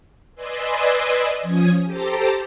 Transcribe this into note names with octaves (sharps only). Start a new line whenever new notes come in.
B4 D5 D#5 G#5 C6 E6
F3 C#4 G#5 D#6 G#6
G4 A4 C5 A5 A#5 D6